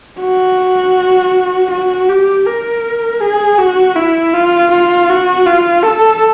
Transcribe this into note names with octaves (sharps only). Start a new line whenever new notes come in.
F#4
F#4
G4
A#4
G#4
F#4
E4
F4
F4
F#4
F4
A4